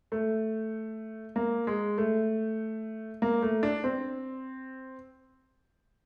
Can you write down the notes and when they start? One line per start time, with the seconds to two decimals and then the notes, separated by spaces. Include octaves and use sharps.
0.12 A3
1.36 A#3
1.67 G#3
1.98 A3
3.22 A#3
3.42 A3
3.63 D4
3.84 C4